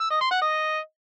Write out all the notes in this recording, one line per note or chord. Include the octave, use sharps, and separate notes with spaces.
E6
D#5
C6
F#5
D#5